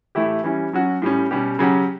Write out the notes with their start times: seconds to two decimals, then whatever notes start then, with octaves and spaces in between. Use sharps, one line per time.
0.15 A2 E3 A3 E4 G4
0.44 E3 G3 C#4
0.73 F#3 C#4 F#4
1.02 A2 G3 C#4
1.31 B2 G3 C#4 G4
1.59 C#3 F#3 C#4 G4